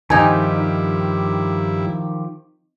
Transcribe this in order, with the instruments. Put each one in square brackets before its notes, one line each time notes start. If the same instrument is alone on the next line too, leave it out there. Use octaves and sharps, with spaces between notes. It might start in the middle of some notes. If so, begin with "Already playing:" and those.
[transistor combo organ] G2 E4 [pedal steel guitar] D#3 F3 G4 [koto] C4 D#4 [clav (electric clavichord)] G#5